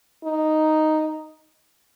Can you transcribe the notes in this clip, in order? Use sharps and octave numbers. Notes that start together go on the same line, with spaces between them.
D#4